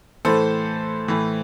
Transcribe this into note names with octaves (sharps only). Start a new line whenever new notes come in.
A2 E3 A4 C5
A2 E3